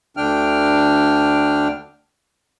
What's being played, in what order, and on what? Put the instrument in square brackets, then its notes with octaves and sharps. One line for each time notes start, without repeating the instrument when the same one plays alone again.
[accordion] D2 D3 D4 G5 F6